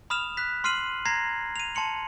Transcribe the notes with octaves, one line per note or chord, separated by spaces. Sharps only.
B5 D#6 F6 E7 F7
F#6 B6
C6 F6 C7 D#7 F#7
A#5 G#6 A#6 C7
D#7 F7
A5 C6 C#7 F#7